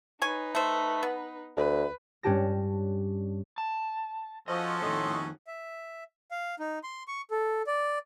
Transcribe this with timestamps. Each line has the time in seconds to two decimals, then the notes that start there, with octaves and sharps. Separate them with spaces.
0.22 D#4 B4 C#5 G#5
0.55 A3 C5
1.03 B3
1.57 D2 B4
2.23 G2 C#4 D4 G4 A5 A#6
3.58 A5
4.48 F3 C#4 F#4 A4 D#5
4.82 F2 A2 D#3 D#5 C6
5.47 E5
6.31 F5
6.59 D#4
6.84 C6
7.08 C#6
7.31 A4
7.67 D5